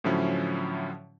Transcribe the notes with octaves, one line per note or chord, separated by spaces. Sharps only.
A2 D3 F3 F#3 C#4 E4